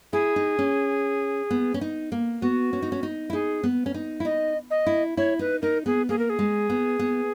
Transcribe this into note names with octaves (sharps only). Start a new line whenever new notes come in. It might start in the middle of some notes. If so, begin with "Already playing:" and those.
E4 G#4
D#4
C#4
B3
C#4
D#4
A#3
B3 F#4
C#4
D#4
C#4
D#4
E4
D#4 G#4
B3
C#4
D#4
E4
D#4 D#5
D#5
E4
E4 C#5
D#4 B4
D#4 A#4
B3 G#4
A#3 G#4
A#4
G#4
G#3
B3
B3